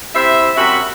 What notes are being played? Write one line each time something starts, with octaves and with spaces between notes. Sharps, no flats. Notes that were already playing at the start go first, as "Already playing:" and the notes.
C3 E4 C5 E5
F#2 C3 F#4 E5 B5